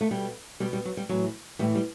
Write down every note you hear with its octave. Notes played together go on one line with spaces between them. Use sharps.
A3
B2 G3
B2 G3
G3
F#3
G3
A2 E3 F#3
A2 E3 G3
G3